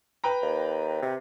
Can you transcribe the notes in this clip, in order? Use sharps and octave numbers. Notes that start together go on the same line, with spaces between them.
B4 G5 A#5
D#2
C3